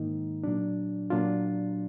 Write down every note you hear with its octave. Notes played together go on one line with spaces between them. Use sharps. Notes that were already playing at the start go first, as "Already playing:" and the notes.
Already playing: G#2 D#3 A#3 D#4
A#2 F#3 D4
A#2 F#3 D4 F4